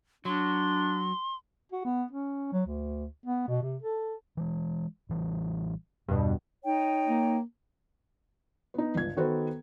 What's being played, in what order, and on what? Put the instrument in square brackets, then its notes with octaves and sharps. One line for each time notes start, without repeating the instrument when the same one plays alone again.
[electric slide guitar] F#3 [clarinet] D4 [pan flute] C6
[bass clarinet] F#4
B3
C#4
F#3
D2
B3
B2
C3
A4
[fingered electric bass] E3 G#3
A1 E3 G3
[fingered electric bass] E2 [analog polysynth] G2 B2
[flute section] D#4 C#5 G5
[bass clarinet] A#3
[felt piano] B3 D#4
G1 C#2 G#6
D#3 B3 F#4 A4 B4 C5